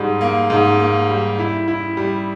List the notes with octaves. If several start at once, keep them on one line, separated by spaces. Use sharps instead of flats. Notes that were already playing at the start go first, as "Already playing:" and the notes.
Already playing: G#2 G3
A#3
G#2
A#3
G3
E4
E4
G3